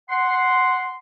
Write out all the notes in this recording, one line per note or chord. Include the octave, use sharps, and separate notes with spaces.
F#5 C6